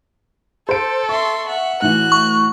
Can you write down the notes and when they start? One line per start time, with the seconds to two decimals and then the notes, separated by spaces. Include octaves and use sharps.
0.69 A4 C5 D7
1.09 E5 C6 C#6
1.46 E5 F#5
1.82 A2 E3 F#4 F#6
2.12 C#6